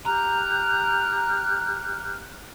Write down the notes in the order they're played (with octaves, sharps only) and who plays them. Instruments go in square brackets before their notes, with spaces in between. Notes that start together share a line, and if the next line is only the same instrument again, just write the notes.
[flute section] G4 F6 F#6 [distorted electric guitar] A#5